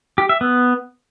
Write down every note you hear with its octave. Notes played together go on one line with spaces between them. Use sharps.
G4
E5
B3